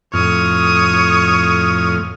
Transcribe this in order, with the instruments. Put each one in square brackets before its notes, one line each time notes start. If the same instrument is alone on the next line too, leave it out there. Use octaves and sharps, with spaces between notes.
[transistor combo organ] F2 A2 F6 [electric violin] C#5 D#6